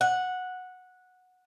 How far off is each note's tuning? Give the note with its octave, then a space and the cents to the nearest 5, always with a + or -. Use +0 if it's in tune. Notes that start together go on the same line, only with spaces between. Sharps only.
F#5 -10